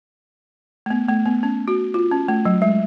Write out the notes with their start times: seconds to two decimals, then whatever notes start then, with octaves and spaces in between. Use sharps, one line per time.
0.86 A3
0.90 B3
1.09 A3
1.25 B3
1.43 C#4
1.68 F#4
1.94 F4
2.12 C#4
2.28 A3
2.45 F#3
2.62 G#3